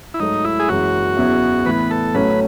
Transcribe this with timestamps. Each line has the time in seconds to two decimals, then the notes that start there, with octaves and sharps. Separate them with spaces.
0.14 E4
0.20 G#2 F#3 A3 D#4
0.44 E4
0.60 G#4
0.68 F#1 F#2 E3 G#3 F#4
1.17 E2 C#3 F#3 B3 E4
1.66 A2 E3 B3 B4
1.91 A4
2.14 A1 A2 F#3 A3 C#4 B4